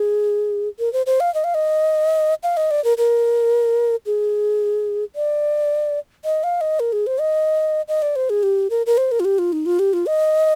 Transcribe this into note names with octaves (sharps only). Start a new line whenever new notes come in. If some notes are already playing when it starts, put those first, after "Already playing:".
Already playing: G#4
A#4
C5
C5
F5
D#5
F5
D#5
F5
D#5
D5
A#4
A#4
G#4
D5
D#5
F5
D#5
A#4
G#4
C5
D#5
D#5
D5
C5
G#4
G4
A#4
A#4
C5
A#4
F4
G4
F4
D#4
F4
G4
F4
D#5